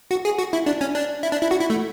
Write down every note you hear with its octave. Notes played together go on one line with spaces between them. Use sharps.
F#4
G#4
F#4
E4
D4
C#4
D4
E4
D4
E4
F#4
E4
A3